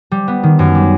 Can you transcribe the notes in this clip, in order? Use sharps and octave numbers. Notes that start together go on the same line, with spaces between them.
G3
B3
D#3
F#2
G3